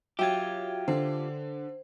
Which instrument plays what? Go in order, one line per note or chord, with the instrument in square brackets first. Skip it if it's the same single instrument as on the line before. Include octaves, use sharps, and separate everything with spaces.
[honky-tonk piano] F#3 [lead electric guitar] F4 G4 [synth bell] E5 G5 G#6
[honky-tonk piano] D3 [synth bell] C5